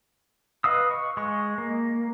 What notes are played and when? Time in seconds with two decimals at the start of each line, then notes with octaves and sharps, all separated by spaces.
0.64 B4 D#5 F5 D#6 E6
0.91 C#6
1.17 G#3 C#6
1.58 A#3